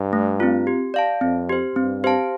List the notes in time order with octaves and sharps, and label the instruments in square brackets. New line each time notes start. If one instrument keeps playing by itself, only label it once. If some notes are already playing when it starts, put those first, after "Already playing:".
Already playing: [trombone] G2
[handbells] A3
C4 F4
G4
D5 F5 A5
[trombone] F2 [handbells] C4
[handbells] G4 C5
[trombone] G2 [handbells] C4
[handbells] G4 C5 F5 A5